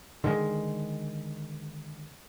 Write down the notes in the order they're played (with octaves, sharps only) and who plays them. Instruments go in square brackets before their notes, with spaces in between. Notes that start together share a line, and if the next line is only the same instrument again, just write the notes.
[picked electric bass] D3 D#3 G3 G#3